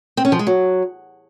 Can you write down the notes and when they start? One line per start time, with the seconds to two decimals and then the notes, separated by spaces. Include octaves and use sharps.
0.17 C4
0.25 C#4
0.32 F3
0.39 G#3
0.47 F#3